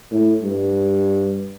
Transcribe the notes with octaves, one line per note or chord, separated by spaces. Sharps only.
A2
G2